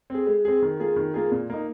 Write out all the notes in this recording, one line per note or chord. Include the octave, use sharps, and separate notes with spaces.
C4 G#4
G#3
C4 G#4
D#3
A#3 F4 G#4
D#3
A#3 F4 G#4
A#2
A#3 D#4